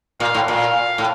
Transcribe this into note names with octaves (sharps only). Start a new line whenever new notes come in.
A#2 F5
A2
A#2 F5
A2